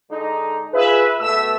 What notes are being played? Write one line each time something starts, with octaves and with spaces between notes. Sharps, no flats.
D3 G#3 D#4
F4 G#4 B4 E5
B2 A3 E5 E6